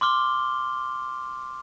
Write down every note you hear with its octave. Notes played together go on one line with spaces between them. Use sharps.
C6 D6 F6 G7